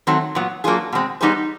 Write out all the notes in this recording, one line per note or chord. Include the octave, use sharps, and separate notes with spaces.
D#3 F#3 A3 C4
A#2 F#3 B3
F#3 A#3 D4 F4 G#4
B2 G#3 C4
G3 B3 D#4 G#4 C5